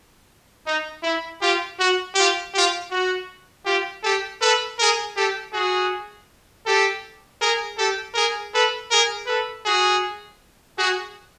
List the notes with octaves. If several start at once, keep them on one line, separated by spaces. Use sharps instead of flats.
D#4
E4
F4 G4
F#4
F4 G4
F4 G4
F#4
F4 G4
G4 A4
A4 B4
G#4 A#4
G4 A4
F#4 G#4
G4 A4
G#4 A#4
G4 A4
G#4 A#4
A4 B4
G#4 A#4
A4 B4
F#4 G#4
F#4 G#4